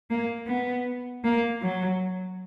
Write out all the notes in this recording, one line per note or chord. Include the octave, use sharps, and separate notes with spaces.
A#3
B3
A#3
F#3